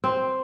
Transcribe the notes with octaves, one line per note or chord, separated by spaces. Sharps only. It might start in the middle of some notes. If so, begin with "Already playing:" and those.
C4